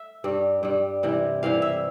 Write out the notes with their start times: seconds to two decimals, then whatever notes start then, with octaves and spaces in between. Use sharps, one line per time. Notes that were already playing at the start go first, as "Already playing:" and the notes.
Already playing: E5
0.24 G2 G3
0.63 G2 G3
1.03 C3 E3 G3
1.43 C3 E3 G3 F5
1.62 E5